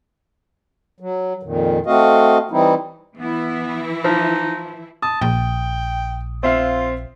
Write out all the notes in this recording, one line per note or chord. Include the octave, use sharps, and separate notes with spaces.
F#3
F2 A#2 D#3
A3 C4 F#4 D#5 F5
E3 G3 C4 D#4 E4
E3 B3 E4
F3 D#4
A5 D#6
A#1 G5
C4 F4 E5 F5